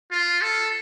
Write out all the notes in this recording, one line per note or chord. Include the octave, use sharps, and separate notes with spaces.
F4
A4